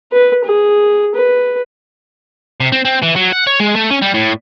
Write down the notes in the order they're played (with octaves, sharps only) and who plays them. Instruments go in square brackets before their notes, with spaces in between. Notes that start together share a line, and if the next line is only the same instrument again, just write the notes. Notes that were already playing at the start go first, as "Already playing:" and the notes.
[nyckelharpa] B4
G#4
B4
[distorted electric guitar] C3
C4
C4
E3
F#3
F#5
C#5
G#3
A3
C#4
G3
A2